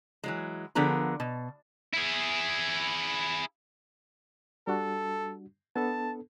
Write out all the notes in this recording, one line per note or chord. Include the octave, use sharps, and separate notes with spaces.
E3 F#3 G#3
D3 F3 B3 G#4 A#4
B2
E4 G#4
G3 D4 F#4 A4
B3 D4 A4 A5